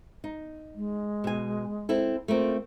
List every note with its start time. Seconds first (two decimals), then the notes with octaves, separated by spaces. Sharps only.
0.24 D#4
0.75 G#3
1.24 B2 G#5
1.89 C4 E4 A4
2.28 A3 A#3 C4 F4